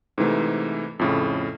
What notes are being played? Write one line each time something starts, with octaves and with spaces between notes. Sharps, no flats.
G#2 C3 E3 A3
F2 A2 C#3